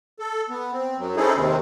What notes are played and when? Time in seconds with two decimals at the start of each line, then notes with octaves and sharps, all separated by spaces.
0.20 A4
0.50 B3
0.73 C4
0.99 F#2 F#3
1.17 C4 C#4 D#4 E4 G#4 A4
1.37 D#2 C3 D#3 G#3 C4